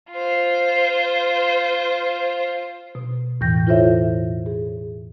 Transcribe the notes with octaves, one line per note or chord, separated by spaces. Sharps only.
F4 C5
B2
E2 A2 E3 G5 G6 A#6
E4 F4 A4 C5 C#5 E5
G#4